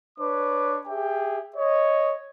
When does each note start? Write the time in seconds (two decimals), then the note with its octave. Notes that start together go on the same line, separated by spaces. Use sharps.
0.19 D4 B4 C#5 D6
0.87 G4 G#4 E5 G5
1.56 C#5 D#5